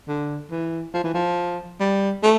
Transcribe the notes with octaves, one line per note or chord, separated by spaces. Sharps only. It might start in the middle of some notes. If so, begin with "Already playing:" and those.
D3
E3
F3
E3
F3
G3
A3